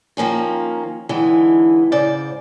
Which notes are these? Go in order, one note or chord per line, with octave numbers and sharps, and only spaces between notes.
D#3 F3 A#3 C#4 F4
D#2 D3 E3 G#3
G#2 C#3 C5 D5